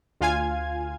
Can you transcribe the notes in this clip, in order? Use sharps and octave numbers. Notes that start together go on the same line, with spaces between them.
D2 F4 F5 G#5 G#6